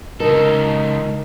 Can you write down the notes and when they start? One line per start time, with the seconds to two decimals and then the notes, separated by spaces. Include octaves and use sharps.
0.20 C#2 D#4 A4 A#4